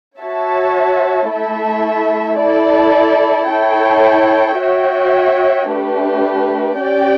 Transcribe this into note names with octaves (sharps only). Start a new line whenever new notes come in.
F#4 C#5 E5 A5
A3 E4 A4 E5
E4 A4 D5
E4 A4 C#5 G5
F#4 C#5 E5 G5
A3 D4 G4 B4
C#4 G4 D5 G5